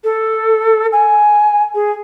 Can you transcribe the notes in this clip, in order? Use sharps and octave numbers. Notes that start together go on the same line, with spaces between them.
A4
G#5
G#4